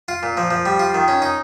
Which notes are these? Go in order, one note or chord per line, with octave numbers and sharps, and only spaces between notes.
F4
A#2
F3
F3
G3
F4
D#3
C#4
D#4